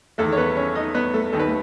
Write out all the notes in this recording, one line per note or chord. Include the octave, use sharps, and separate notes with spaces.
E2 D#3 A3 A4
C#5
B3 B4
C#4 C#5
D#4 D#5
B3 B4
A3 A4
D#2 D#3 A4
B4
A3